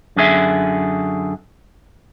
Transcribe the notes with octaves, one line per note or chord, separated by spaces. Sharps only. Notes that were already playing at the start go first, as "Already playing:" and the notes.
F#2 D3 G#4 E5